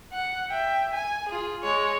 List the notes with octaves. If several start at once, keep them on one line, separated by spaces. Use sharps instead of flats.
F#5
E5 G5
G#5
F4 G#4
G#3 C#5